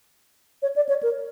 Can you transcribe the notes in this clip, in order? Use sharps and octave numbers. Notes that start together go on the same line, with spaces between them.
C#5
D5
C#5
A#4